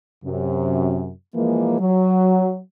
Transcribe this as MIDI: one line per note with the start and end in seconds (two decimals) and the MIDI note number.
0.25 1.11 42
0.25 1.11 48
1.35 1.77 52
1.35 1.77 53
1.35 1.77 56
1.35 1.77 58
1.80 2.59 54